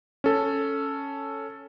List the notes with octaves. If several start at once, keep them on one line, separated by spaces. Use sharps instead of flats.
C#4 A4